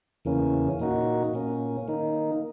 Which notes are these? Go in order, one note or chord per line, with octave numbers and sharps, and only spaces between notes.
E2 C#3 E3 A#3 C#4
A#2 A#3 D#4 F#4
A#2 A#3 C#4
D#3 A#3 D#4